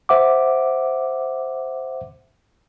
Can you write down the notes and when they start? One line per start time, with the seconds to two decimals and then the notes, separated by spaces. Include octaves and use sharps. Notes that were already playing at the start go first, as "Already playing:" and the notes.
0.09 C5 E5 F#5 D6